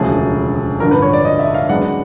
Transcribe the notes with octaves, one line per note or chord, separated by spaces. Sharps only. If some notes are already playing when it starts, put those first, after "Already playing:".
Already playing: E1 D2 C#3 F3 A3 G#4
A1 G2 D3 F3 A#4
B4
C#5
D5
D#5
E5
F5
F#2 D#3 G#3 B3 D4 F#5